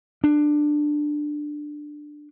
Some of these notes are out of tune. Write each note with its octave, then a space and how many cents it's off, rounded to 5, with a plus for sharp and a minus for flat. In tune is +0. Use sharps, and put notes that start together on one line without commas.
D4 +15